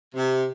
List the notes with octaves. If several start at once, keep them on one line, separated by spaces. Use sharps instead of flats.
C3